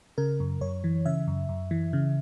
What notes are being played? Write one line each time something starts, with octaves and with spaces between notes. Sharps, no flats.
C#3 A#4
F#2
F#2 C#5
E3
C#3 E5
F#2
F#2
E3
C#3